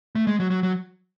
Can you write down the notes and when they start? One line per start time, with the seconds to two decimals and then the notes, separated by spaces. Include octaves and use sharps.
0.15 A3
0.27 G#3
0.40 F#3
0.51 F#3
0.63 F#3